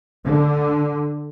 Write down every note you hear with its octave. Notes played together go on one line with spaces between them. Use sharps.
D3